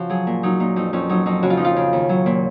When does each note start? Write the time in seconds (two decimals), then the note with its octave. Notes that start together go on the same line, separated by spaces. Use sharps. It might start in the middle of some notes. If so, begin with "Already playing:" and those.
Already playing: C#3 F3 F#4
0.09 F#3 G#4
0.27 A#2 A#4
0.43 F#3 D#4
0.60 A#2 D#4
0.76 F2 D#4
0.93 F2 C#4
1.09 F#3 D#4
1.26 F2 D#4
1.43 C#3 F#4
1.50 F4
1.57 F3 D#4
1.65 F4
1.76 C#3
1.93 D#2
2.09 F#3
2.26 A#2